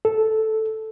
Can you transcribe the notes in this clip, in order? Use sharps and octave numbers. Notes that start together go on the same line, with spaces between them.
A4